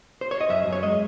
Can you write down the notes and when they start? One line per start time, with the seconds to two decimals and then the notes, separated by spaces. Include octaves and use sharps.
0.21 C5
0.31 C#5
0.41 D#5
0.50 F#2 E5
0.67 F#2
0.73 C#5
0.83 G#3 D#5